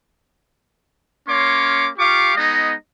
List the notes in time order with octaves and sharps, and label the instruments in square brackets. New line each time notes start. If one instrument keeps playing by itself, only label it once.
[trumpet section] A#3 C#4 C#5 C6 D6
F4 G4 F5 C#6 D6
G#3 B3 D#4 D#5